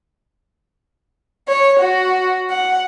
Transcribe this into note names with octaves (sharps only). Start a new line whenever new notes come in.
C#5
F#4
F#5